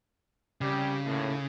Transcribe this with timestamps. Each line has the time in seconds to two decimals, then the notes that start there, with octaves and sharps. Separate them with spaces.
0.61 C2 C#3 G3 G4
1.05 D#2 A2